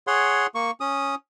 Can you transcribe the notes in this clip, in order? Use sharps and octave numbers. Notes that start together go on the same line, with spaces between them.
G#4 C#5 F#5 C6
A#3 C#6
C#4 D#6